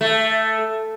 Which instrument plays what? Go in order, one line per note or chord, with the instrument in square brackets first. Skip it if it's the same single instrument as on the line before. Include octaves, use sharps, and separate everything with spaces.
[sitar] A3